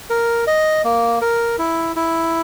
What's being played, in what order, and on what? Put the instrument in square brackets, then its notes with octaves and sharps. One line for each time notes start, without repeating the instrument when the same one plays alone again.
[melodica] A#4
D#5
A#3
A#4
E4
E4